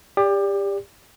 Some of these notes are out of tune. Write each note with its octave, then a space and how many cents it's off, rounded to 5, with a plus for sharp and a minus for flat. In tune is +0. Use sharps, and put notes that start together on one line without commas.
G4 +25 D5 -15